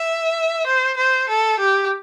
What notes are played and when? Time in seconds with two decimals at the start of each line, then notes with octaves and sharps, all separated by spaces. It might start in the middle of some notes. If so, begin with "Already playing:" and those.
Already playing: E5
0.67 C5
0.97 C5
1.29 A4
1.59 G4